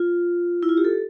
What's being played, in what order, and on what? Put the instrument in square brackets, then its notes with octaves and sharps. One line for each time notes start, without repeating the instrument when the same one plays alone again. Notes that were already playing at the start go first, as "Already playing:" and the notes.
Already playing: [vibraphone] F4
E4
F4
G4
A4